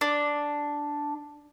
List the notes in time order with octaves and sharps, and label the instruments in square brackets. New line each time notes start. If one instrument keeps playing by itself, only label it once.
[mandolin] D4